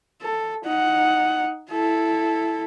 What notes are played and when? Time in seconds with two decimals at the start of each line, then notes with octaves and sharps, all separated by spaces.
0.22 A4
0.65 D#4 F#5
1.71 E4 A4